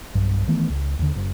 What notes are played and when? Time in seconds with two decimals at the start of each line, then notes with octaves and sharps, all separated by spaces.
0.15 B1 G2
0.47 D#3 E3 A3 B3
0.69 C#2
0.99 D#2 D3
1.16 F#1